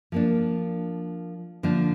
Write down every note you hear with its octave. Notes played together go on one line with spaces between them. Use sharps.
F3 A#3 D4
D3 F3 A#3 D4